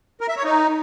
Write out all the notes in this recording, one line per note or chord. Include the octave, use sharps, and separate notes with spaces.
A#4
E5
C#5
D#4